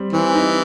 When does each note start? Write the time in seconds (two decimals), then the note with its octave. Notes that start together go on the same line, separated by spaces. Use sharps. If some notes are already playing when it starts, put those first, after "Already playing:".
Already playing: G3 C4
0.13 E3 C4
0.35 D#4